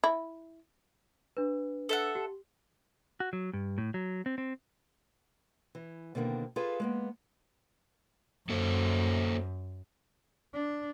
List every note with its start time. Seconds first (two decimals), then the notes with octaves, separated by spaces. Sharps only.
0.04 E4
1.37 D4 B4
1.89 A4 E5 F#5
2.15 G4
3.20 F#4
3.33 F#3
3.53 G2
3.78 A2
3.94 F#3
4.26 C4
4.38 C4
5.75 E3
6.15 B2 D3 D#3 A#3 C4
6.56 F4 G#4 A4 B4 F5
6.80 G#3 A#3 B3
8.49 F#2 A#3 A4 C5
10.53 D4